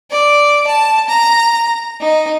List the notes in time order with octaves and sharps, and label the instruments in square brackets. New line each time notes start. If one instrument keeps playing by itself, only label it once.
[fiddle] D5
A5
A#5
D#4